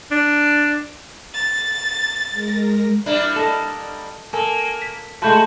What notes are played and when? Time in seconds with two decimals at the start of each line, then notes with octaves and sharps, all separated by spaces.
0.11 D4
1.33 A6
2.31 G#3 A#4 A#6
3.06 G3 A#3 D4 E4
3.36 A4 D#5 E7
4.33 A#3 A4 A#4 G#5
4.82 B6
5.22 G#3 A3 F4 F#4 A5 B5 G6